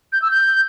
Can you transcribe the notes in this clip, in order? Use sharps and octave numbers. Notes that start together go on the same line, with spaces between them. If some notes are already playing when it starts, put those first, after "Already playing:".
G6
E6
G6